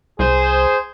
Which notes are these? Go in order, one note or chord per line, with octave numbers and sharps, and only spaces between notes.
C2 G#4 C5